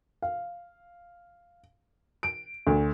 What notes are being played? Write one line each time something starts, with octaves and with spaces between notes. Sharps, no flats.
F5
D7
D2